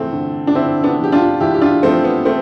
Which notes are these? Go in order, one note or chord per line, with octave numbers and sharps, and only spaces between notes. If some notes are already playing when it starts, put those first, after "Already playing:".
Already playing: E2 A3 C4
D3
D4
D3 C4 E4
B3 D4
F3
G4
D4 F4
E2 E4 G4
G4
D4 F4
F3 A3 C4
B3
A3 C4